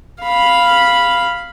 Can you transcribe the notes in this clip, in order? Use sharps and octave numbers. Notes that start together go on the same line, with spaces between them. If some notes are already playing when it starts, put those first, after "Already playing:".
F5 B5